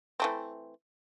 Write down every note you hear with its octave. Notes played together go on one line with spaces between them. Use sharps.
E3 A3 C4